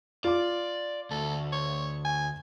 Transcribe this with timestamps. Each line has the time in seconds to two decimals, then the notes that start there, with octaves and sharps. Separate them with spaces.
0.24 F4 D5 D6
1.11 D2 A4
1.52 C#5
2.05 G#5